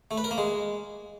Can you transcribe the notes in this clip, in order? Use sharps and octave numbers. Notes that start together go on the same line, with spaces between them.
A3
B4
A#4
A#3
G#3